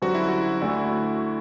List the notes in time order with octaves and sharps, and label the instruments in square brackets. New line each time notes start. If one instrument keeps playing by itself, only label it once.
[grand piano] F#2 D3 G3 C4 [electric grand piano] F#4
[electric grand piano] E4
F#4
[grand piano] D2 D3 A3 E4